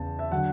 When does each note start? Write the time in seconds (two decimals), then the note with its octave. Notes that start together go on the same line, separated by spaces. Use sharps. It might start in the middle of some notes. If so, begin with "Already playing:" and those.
Already playing: E2 C#3 A5
0.19 E5
0.31 D3 F#3 F#5